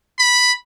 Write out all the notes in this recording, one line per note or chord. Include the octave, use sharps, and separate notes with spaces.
B5